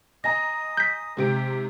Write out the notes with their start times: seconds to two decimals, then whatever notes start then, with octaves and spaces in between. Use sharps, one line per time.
0.24 D#5 G#5 A#5 D#6 A#6
0.77 G6 B6
1.17 G#2 C3 G4 D7